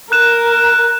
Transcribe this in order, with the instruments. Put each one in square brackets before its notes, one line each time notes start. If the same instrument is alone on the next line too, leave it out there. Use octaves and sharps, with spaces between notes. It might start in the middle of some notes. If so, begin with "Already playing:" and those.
[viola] A#4 [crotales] F#6 E7